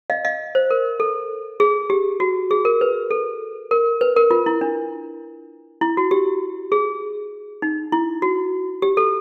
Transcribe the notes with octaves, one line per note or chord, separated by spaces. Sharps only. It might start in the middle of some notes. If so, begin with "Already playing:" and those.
D#5 F5
D#5 F5
C5
A#4
A4
G#4
G4
F#4
G#4
A#4
B4
A4
A#4
B4
A#4
F4
E4
D4
E4
F#4
G4
G#4
D#4
E4
F#4
G4
A4